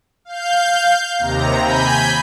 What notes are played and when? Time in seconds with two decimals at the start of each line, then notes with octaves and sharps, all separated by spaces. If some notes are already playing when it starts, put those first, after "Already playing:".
0.25 F5 G6
1.19 D#2 C3 A#5
1.61 G#5 B5 G6